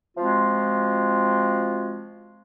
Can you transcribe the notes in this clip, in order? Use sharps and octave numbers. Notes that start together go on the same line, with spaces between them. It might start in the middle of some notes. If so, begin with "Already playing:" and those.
F3 G#3 C4 F4 F#4